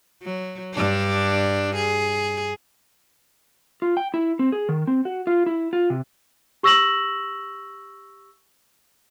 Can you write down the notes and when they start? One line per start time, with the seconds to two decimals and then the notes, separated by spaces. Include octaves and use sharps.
0.22 F#3
0.74 G2 D4
1.75 G#4
3.82 F4
3.97 G5
4.14 E4
4.39 C4
4.52 G#4
4.69 D#3
4.87 C4
5.05 F#4
5.27 F4
5.46 E4
5.73 F4
5.90 C3
6.63 G4 C#6 E6 A#6 E7 F#7